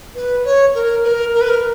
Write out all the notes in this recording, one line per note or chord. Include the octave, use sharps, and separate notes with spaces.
B4
C#5
A#4
B4
A#4
A#4
B4
A#4